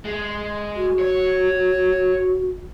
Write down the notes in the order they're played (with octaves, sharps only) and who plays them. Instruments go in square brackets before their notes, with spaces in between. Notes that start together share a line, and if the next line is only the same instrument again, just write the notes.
[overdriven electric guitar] G#3
[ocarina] F#4
[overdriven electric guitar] C#5